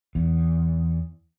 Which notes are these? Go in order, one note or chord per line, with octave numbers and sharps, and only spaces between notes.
E2